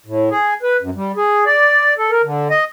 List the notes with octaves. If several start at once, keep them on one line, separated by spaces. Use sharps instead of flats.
A2
G#4
B4
F#2
G3
G#4
D5
A4
A#4
D3
D#5